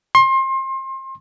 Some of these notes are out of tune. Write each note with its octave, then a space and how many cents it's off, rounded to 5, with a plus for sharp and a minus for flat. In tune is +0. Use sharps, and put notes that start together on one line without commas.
C6 +30